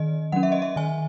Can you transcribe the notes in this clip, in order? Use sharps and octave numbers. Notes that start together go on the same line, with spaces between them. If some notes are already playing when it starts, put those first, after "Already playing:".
Already playing: D#3 D#5
F#3 C#4 F#5
E5
D#5
E5
D#3 G#5